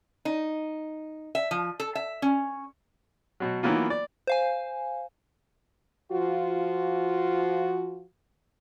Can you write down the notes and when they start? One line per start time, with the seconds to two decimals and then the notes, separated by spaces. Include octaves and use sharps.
0.25 D#4
1.35 E5
1.51 F3
1.80 A4
1.95 E5
2.22 C#4
3.40 B2 F#3
3.63 D#3 E3 F#3 A#3 B3 F4
3.90 D5
4.27 C5 F5 G#5
6.12 F3 F4 F#4